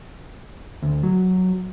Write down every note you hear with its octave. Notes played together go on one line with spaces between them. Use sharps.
D2
F#3